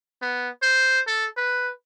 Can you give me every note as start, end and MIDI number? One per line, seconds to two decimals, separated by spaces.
0.22 0.49 59
0.62 1.00 72
1.07 1.26 69
1.37 1.72 71